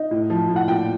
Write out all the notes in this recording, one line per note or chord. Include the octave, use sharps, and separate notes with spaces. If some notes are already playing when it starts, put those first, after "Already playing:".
Already playing: D#4
A2
F3
A2
F#5
A#2 G5